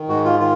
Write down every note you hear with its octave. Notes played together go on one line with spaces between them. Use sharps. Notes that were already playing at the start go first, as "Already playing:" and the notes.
Already playing: D#3
G#2 F#4
F4
D#3 F4